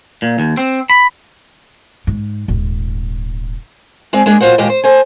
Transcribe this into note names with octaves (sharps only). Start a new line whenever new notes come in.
A#2
D#2
C4
B5
G#2
D#1 G#2
G#3 C4 G#4 D5
G#3 A#3 D4 G#4
A#2 F4 F#4 C5 F#5
D#2 A#2 G#3 G4 D#5
C5
A4 C5 G#5